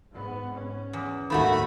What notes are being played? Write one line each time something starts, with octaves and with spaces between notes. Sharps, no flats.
G#2 B3
C#4
E2
A#1 D#2 G#2 D#3 A3 F#4 B5